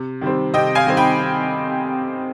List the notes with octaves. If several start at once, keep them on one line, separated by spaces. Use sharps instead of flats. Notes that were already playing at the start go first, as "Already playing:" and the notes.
Already playing: C3
D#3 G3 C4
C3 D#5 G5
F5 G#5
D#3 G3 C4
G5 B5